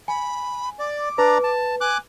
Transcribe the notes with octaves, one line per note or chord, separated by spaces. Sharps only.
G#5 B5
D5 D6
D4 B4 D5 A#5
A5
G#5 D6 F#6